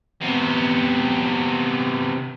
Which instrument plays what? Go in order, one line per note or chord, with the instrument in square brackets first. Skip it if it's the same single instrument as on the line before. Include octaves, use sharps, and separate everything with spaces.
[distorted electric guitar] C3 B3